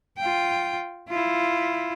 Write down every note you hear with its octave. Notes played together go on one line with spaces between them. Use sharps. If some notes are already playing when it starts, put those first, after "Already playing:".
F4 G5
E4 F4